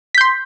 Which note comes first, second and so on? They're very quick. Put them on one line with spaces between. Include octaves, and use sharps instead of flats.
B6 G6 C6